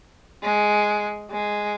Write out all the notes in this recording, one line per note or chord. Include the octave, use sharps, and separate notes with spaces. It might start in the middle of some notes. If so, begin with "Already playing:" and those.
G#3
G#3